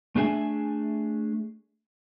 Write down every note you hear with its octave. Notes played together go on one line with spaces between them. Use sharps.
A3 D4 G#4 E5 G#5